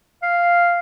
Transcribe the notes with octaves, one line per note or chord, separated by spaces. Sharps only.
F5